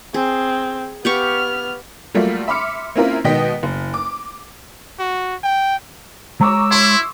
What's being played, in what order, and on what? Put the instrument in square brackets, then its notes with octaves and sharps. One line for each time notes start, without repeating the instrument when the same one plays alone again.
[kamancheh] C4 [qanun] G#4
[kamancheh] B3 F6 [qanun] G4 F5 C#6
[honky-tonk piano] F#3 G3 A3 A#3 F4
E5 B5 C6 D6 F6 C#7
A#3 C4 C#4 E4 F4 A#4
B2 D#3 G#3 D#5 G5 B6
F#1
D6
[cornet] F#4
G5
[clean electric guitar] G#3 C#5 [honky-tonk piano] A#5 C#6 D6 [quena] E6
[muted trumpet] E4 [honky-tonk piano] C6 C#6